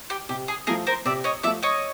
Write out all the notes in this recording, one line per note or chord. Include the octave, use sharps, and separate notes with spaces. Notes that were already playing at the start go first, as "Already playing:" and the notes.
G4
C3 G4
G#4
F3 A3 G#4 A#4
A#4 C5
C3 D5 E5
C#5 D#5
F3 A3 D5 E5
C#5 D#5